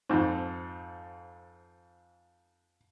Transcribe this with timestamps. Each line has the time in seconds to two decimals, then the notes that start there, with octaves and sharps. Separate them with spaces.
0.09 F2 G#2